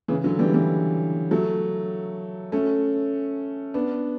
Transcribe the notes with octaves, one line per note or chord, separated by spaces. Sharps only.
C#3 E3
D3 F#3
E3 G3
E3 G3
F#3 A3
A3 C#4
B3 D4